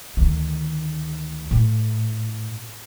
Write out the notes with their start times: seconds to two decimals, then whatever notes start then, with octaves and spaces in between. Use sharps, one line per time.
0.17 D2 D#3
1.51 A2